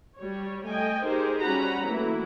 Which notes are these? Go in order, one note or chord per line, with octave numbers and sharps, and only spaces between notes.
G3 C#5
A3 D#5 G5 G#5
D#4 G4 G#4 A#4 C5
G3 C#4 F#4 F#5 A#5 B5
E3 F#3 A3 A#3 E4